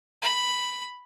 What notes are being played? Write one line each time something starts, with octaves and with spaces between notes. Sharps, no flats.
B5